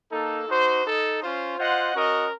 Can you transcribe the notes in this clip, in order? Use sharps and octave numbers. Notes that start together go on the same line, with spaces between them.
A#3 D#4 A4
D#4 F#4 C5
D#4 A4 D#5
C#4 F4 C5
F4 C5 D#5 F#5
C#4 F#4 A#4 D#5